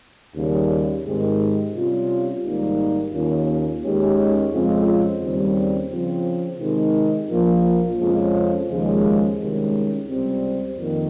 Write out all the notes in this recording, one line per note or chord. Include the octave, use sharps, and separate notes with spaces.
D#2 C#3 G3
G#2 D#3 G#3 C4 G4
C3 G3 C#4 F4
G#1 G#2 G3 A#3 D#4
D#2 D#3 A#3 C#4 F4
D#2 D#3 G#3 C#4 G4
F2 C#3 G#3 C4 F4
D#2 C#3 G3 C4
C#3 F3 C4
C3 D#3 G#3 C4 D#4
A#1 A#2 F3 A#3
F2 C#3 F3 G#3 C#4
D#2 C#3 F3 G#3
C2 C3 D#3 G#3 C#4
C#2 C3 G3 C4
F2 D#3 A#3